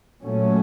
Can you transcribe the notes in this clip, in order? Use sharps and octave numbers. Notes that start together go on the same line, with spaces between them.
A#2 F#3 A3 C#4